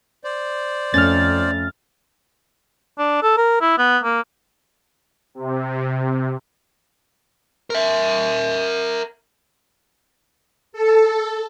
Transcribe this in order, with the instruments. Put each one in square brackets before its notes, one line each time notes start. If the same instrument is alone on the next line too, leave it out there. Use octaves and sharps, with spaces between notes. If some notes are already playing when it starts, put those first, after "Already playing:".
[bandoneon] C5 D5
[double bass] F2 [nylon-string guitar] A3 C#4 [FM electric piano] F6 A6
[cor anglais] D4
A4
A#4
E4
B3
A#3
[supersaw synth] C3
[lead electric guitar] A#4 E5
[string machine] A4